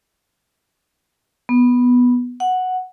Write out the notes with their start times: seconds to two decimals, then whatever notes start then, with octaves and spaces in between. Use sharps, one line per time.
1.49 B3
2.40 F#5